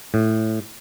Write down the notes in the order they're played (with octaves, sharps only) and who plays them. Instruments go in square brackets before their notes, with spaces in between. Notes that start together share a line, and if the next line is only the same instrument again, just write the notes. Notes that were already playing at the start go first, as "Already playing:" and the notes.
[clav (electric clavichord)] A2